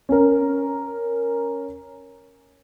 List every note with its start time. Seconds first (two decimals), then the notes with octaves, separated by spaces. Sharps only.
0.09 C#4 A#4